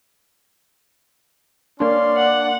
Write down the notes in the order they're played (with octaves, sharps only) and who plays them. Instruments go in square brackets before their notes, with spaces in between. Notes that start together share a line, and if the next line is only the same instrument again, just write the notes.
[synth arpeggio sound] A#3 D4 [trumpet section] C#4 F5 C6 [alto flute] D5
[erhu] F#5